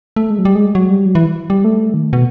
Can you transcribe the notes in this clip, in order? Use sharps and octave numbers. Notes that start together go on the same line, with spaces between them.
A3
G#3
F#3
G3
G#3
F#3
G3
F#3
E3
G3
A3
D#3
B2